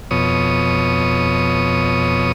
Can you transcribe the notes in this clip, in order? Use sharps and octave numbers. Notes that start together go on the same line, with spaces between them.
F2 B2 C#5 D#6